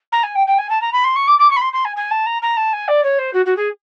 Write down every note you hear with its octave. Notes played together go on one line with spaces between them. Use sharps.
A#5
G#5
G5
G5
G#5
A5
A#5
B5
C6
C#6
D6
D6
C#6
B5
C6
C6
G#5
G#5
A5
A#5
A#5
A5
G#5
D5
C#5
C5
F#4
F#4
G#4